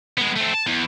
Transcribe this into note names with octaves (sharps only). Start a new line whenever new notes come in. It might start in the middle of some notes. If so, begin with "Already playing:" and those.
G#3 B3
A3 C4
A5
E2